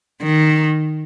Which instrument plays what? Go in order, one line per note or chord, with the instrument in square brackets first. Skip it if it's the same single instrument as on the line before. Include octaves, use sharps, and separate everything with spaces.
[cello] D#3